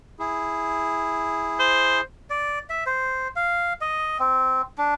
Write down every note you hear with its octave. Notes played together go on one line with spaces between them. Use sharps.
E4 G#4
C5
D5
E5
C5
F5
D#5
C4
D4